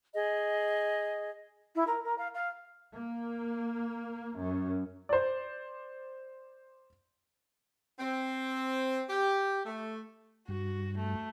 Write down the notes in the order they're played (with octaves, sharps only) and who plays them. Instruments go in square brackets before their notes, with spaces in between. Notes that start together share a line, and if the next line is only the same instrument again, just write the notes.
[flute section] G#4 D#5
[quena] E4
A#4
A#4
F5
F5
[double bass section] A#3
F#2
[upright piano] C5 D5
[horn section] C4
G4
A3
[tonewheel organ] G2 [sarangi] F#4
[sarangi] A3